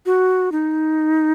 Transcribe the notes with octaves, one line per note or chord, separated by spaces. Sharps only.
F#4
D#4